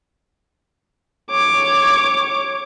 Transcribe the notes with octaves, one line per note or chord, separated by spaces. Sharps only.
C#5 D6